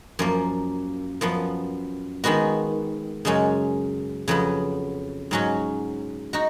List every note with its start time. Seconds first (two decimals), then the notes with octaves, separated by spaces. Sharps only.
0.19 F#2 F3 A#3
1.21 F#2 F3 B3
2.24 D#3 G#3 B3 F#4
3.25 F#2 C#3 G#3 C#4
4.28 F2 C#3 F#3 B3
5.31 G#2 F#3 C#4 F#4
6.33 D#4 F#4